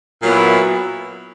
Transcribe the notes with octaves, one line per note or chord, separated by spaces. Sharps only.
A#2 F#3 B3 E4